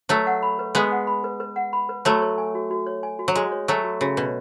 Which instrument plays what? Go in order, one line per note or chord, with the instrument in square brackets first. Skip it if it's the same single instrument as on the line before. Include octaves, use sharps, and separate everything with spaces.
[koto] F#3 A3 [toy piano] B4
[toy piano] F#5
B5
B4
[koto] G#3 B3 [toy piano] B4
[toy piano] F#5
B5
B4
B4
F#5
B5
B4
[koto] F#3 A3 [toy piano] F#4
[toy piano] C#5
G#5
F#4
F#4
C#5
G#5
F#4
[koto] F#3
[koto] G#3 [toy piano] F#4
[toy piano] C#5
[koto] F#3 A3 [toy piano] G#5
[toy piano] F#4
[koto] C#3 [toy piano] F#4
[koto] B2 [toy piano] C#5